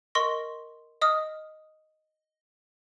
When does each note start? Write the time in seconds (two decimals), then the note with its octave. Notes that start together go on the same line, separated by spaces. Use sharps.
0.15 A#4 D#5 C6 C#6 A#6
1.01 D#5 D#6 F6